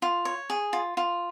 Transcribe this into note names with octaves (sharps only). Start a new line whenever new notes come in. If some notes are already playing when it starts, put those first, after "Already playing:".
F4
C#5
G#4
F4
F4